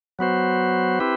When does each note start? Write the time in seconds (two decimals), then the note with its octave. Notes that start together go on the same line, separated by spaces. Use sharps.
0.19 F#3 B3 F#4 C5
1.00 C4 E4 G4 B4